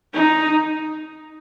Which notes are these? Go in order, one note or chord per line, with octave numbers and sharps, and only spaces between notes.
D#4